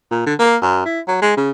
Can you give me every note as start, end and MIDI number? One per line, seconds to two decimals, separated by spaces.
0.11 0.23 46
0.26 0.34 50
0.39 0.56 58
0.62 0.84 42
0.85 1.00 64
1.07 1.22 54
1.22 1.35 56
1.37 1.51 49